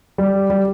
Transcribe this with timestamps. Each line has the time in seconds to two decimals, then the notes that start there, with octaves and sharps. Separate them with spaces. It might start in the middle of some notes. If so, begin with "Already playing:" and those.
0.18 G3
0.50 G3